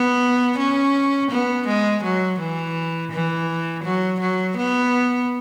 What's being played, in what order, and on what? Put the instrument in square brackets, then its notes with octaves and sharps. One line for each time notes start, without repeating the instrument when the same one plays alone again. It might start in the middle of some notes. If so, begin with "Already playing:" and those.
Already playing: [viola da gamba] B3
C#4
B3
G#3
F#3
E3
E3
F#3
F#3
B3